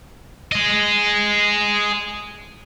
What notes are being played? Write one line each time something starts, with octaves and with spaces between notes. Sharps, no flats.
G#4 D#5